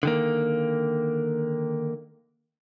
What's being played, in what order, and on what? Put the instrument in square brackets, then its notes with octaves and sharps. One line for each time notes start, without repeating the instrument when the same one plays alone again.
[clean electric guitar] D3 D#3 A#3